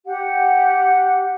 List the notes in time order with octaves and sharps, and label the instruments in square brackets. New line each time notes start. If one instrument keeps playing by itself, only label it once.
[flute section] G4 F#5